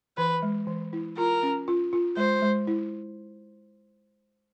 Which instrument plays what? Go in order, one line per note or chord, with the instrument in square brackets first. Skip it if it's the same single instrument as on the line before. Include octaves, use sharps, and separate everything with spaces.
[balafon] E3 [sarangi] B4
[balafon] G#3
E3
E4
[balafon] F4 [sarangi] A#4
[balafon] C#4
F4
F4
[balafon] G#3 [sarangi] C5
[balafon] G#3
E4